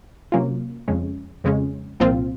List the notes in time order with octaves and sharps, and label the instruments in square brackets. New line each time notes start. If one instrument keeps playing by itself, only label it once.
[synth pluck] C3 F#3 A#3 C#4 F4
F2 C#3 G#3 C#4
F2 C#3 G#3 C#4
C2 A#2 F3 C4 F4